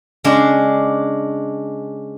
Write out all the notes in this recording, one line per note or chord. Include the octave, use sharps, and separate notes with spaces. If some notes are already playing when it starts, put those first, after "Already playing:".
C#3 G#3 D4